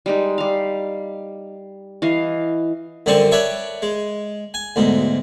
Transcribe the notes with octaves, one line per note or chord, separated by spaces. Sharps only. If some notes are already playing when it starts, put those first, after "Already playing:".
G3 G#3 D#4
G3 F5
E3 D#5 F5
F#2 D3 G3 C4 A5 C#6
B4 C#5 D5 E5 A5 C#6
G#3
G#5
D2 G#2 B2